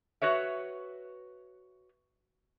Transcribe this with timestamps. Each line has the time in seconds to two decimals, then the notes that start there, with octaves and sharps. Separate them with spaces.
0.22 F#4 B4 C#5 E5